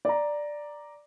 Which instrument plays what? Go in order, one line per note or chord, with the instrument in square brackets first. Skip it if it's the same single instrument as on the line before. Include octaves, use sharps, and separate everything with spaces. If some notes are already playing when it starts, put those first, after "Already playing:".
[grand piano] D5 A#5